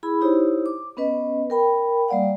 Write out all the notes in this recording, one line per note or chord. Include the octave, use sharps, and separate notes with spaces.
E4 G#4 B5
D#4 E4 G4 C5 C#5
D6
B3 C#4 B4 D#5
A#4 G5 B5
G3 A#3 D5 F5 F#5